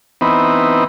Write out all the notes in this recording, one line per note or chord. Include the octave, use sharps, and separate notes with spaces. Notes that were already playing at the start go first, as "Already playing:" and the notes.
E3 B3 C4 D#4